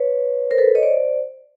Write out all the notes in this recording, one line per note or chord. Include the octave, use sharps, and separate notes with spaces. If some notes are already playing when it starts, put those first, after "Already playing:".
Already playing: B4 C#5
A#4 C5
A4 B4
C#5 D#5
C5 D5